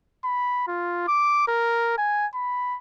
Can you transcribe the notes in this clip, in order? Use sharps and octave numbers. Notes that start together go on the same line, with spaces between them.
B5
F4
D6
A#4
G#5
B5